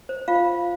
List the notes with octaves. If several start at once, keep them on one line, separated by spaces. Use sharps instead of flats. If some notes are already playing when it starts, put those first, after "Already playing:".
C5
F4 F5